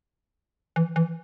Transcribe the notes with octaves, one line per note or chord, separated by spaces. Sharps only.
E3
E3